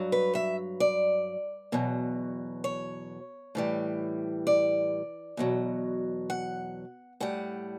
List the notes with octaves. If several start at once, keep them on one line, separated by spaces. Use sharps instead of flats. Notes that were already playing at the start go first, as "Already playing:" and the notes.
Already playing: G2 F#3
B4
E5
D5
E2 B2 F#3
C#5
A2 E3 G3
D5
E2 B2 F#3
F#5
A2 G3 F#5